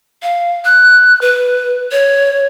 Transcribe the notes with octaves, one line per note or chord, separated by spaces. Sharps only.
F5
F#6
B4
C#5